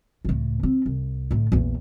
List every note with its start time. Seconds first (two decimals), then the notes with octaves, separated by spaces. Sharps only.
0.25 C#2 A2
0.63 C4
0.86 C2
1.31 A2 D3
1.52 A#1 E2